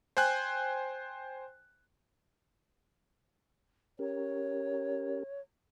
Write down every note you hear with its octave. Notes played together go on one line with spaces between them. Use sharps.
C5 G5 G#5 F#6
C#4 G4 A#4 C#5